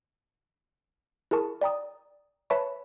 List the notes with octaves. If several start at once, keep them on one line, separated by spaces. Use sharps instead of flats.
E4 G#4 A#4 A5 C#6
D5 G5 A#5 D#6
B4 C#5 E5 A5 B5 C#6